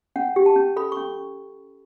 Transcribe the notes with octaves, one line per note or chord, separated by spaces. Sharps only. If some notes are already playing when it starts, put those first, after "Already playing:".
C#4 F#5
G4
A5
C#4
A4 B5
C#6
C#4